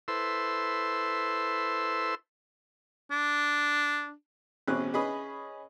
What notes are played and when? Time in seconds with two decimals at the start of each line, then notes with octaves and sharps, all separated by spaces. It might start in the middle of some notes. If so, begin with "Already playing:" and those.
0.08 E4 A4 B4 C5 C6 E6
3.11 D4
4.68 A1 B2 C4 C#4 G#4 F#6
4.94 C#4 G#4 B4 D#5 B5